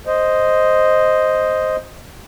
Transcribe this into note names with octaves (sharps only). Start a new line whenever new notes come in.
C5 D#5